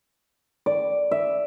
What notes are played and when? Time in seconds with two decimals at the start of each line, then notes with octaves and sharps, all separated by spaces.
0.66 D5
1.11 E5